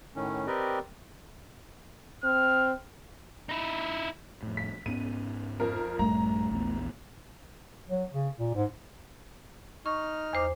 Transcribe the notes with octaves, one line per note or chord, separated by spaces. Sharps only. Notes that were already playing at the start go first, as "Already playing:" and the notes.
A2 D#3 C#4
C4 G4 A#4 B4 D5 D#5
C4 F6
D#4 E4
F2 A2
B6
G#2 B3 C#4 D#7
F2 A#4
A#1 G2 G3 A3 A#5
A#1 E2 B3
F#3
C#3
A#2
G#2
D#4 C#6 F6
E2 C5 D6